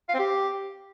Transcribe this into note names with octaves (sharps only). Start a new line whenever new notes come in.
F5
C4
G4